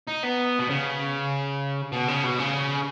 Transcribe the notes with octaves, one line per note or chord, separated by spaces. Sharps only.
D#4
B3
B2
C#3
B2
C#3
B2
C#3